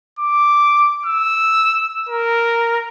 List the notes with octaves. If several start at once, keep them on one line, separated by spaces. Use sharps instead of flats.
D6
E6
A#4